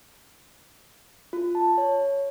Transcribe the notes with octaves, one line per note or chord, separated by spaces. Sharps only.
F4
A5
C#5